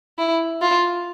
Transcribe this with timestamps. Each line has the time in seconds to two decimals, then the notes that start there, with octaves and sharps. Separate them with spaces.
0.18 E4
0.62 F4